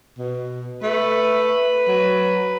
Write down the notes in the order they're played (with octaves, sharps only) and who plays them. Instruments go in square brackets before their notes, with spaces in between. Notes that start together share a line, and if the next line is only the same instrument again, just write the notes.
[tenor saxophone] B2
[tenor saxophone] A3 [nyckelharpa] B4
[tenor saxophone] F#3